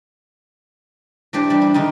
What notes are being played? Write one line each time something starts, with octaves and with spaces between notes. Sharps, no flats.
E3 D4 G4 C5 D5
G3 D4 G4
E4
D3 D#3 G3 D#4